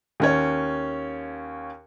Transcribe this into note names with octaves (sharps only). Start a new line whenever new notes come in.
D#2 C#4 C#5